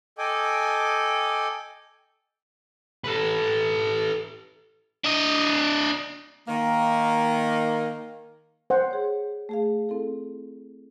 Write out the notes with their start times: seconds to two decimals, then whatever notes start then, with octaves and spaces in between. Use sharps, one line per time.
0.18 A4 D#5 G5 G#5 D6
3.04 A4 B4
5.04 D4 D#5
6.47 D#3 A#3
8.70 C5 F#5
8.91 G#4 C#5
9.49 A3 G#4 F5
9.89 C4 E4 A4